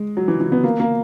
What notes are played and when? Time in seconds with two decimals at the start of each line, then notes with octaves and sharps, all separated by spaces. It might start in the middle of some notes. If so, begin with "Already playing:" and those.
Already playing: G#3
0.17 F#3
0.28 E3
0.40 E3
0.52 B3
0.64 A#3
0.80 A#3